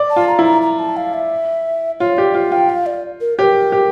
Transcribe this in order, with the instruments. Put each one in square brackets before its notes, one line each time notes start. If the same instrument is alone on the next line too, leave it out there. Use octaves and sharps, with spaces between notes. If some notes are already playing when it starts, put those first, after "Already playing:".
Already playing: [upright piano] D5
[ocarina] A5
[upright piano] F4
[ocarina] A#5
[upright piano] E4
[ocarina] A#5
A#5
A5
F5
E5
[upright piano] F4 [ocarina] C#5
[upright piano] G4 [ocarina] D5
[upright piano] F4 [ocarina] F5
[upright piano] F4 [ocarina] G5
[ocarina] F5
D5
A#4
[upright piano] G4 [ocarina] A#4 C#5
[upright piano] G4